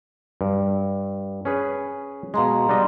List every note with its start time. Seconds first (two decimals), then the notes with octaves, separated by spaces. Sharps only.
0.41 G2
1.45 C#4 G#4 B4
2.34 B2 G#3 F5 A#5 C6
2.69 G3 D4 D#5